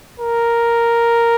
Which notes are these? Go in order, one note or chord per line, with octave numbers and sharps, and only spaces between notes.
A#4